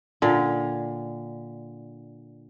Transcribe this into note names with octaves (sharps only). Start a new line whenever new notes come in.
A#2 D3